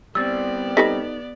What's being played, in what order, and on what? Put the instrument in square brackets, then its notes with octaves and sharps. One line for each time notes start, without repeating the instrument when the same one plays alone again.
[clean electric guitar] G3 C4 [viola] B3 D5 [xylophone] E6 A6
[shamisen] D#4 A4 B4 [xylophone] G4 A#6 B6